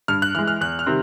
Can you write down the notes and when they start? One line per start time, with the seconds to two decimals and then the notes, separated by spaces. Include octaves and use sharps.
0.08 G2 F6
0.22 F#6
0.35 E3 G#3 F6
0.48 F6
0.61 E2 F#6
0.79 F6
0.86 C3 D#3 G3 C4